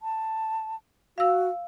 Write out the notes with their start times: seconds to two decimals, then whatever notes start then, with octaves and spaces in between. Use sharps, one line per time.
0.01 A5
1.18 F#4 F5 E6